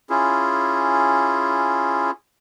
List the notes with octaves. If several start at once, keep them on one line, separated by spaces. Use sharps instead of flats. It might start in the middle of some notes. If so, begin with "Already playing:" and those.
C#4 E4 F4 G#4